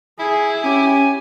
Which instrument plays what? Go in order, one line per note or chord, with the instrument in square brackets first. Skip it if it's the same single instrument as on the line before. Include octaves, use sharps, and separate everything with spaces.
[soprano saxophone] E4 [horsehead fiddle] G#4
[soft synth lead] C#4 [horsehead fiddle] G4 [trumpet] G#5